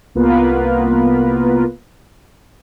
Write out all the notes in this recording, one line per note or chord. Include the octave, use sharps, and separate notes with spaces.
C2 A#3 B3 F4 A#4 B4